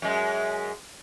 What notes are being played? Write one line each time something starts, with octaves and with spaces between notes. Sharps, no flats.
F#2 G#3